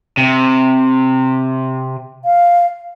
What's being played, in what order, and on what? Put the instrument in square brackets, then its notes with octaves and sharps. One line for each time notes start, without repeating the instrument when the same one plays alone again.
[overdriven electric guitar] C3
[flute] F5